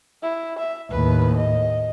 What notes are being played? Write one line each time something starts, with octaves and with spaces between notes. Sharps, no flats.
E4
E5
D#2 A2 B4
D#5